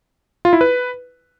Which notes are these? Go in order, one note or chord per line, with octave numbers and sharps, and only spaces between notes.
F4
E4
B4